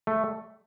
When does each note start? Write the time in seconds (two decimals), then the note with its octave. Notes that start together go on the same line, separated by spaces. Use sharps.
0.07 A3